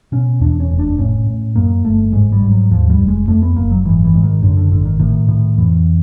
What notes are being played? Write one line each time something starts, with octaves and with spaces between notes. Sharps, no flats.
B2 C#4
E2 D4
C#4
F1
D4
A2 C#4
A2
F#2 A#3
G1 A3
G#2 G#3
G3
G#2
F#3
D#2 F3
G3
F1
G#3
F2 A3
B3
F#1 A#3
F#3
G#2 E3
E3
G#2
D#3
F#2 D3
D3
G#1 D3
D#3
A2 D#3
A2
F2 E3